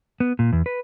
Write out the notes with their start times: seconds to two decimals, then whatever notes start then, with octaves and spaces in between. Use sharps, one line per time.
0.20 B3
0.39 A#2
0.53 E2
0.66 B4